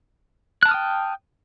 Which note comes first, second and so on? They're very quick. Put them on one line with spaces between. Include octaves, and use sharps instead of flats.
F#6 A5 F6 D#6 G5